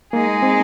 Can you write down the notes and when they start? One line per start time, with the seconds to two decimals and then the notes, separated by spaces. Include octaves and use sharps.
0.13 G#3 A#3 D#4 G#4
0.43 C4